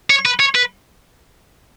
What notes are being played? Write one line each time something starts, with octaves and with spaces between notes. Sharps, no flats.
C#5
B4
C#5
B4